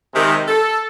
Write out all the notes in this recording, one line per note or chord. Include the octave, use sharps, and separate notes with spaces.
C3 D#3 G#3
A4